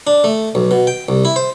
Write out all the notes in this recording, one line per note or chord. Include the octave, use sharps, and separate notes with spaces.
D4
A3
B1
B2
G5
C2
E4
C5